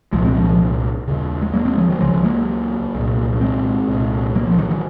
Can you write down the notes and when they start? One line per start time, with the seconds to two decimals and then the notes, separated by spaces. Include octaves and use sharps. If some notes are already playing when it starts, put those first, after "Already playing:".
0.12 C2 A#2 F3 G#3
0.25 G#3 C4
0.37 F3
0.49 F3
1.08 D#2 C#3
1.42 G#3
1.54 F#3 A#3
1.65 G#3 C4
1.77 F3 G#3
1.89 D#3 F#3
2.00 C#2 C#3 F3 G#3
2.24 F#3 A#3
2.95 C2 A#2
3.41 G#3 C4
3.88 C2 A#2
4.35 F#3 A#3
4.47 F3
4.59 D#3 F#3
4.70 D#3 F#3